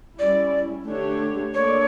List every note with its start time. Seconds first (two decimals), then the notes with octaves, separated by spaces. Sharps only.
0.18 G3 C#4 E4 D5
0.86 D3 A3 D4 G4 C#5
1.54 A#3 D4 A4 C#5 D5